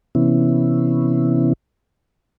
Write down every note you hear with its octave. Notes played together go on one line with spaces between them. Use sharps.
C3 E3 B3 C#4 E4